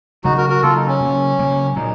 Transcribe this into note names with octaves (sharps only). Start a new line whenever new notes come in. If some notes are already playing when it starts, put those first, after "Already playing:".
C#3 F#3 A#3 D#4 F#4
F#4 A#4
F#4 A#4
C#3 F#3 A#3 F4 A4
D#4
C#4
C#3 F#3 A#3
C#3 F#3 A#3
A#2 F#3 A#3 D#4